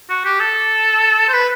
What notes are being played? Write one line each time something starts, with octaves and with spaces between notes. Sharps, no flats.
F#4
G4
A4
C5
B4